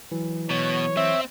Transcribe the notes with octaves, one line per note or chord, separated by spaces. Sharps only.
E3 F#3
B2 C#5
C4 E5